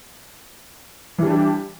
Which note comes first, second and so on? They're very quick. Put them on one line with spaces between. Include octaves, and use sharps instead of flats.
E3 G3 D4 G4